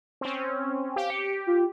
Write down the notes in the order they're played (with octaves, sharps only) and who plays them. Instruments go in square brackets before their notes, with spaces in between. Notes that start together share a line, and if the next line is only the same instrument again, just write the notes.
[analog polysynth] C4 C#4
[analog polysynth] G4 [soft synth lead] F5
[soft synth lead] C#7
F4